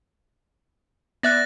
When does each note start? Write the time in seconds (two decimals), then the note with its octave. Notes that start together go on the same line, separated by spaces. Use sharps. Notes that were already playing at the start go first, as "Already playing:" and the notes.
1.23 B3 D5 E5 F#6 A6 A#6